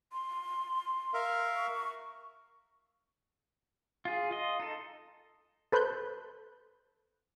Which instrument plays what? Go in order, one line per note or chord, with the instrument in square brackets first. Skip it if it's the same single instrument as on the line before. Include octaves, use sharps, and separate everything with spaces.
[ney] C6
[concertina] A#4 E5 F5
[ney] C#6
[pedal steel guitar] F4 G#4
F4 D#5
D#4 A4
[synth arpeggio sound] A4 B4 C5 B5 F#6 G6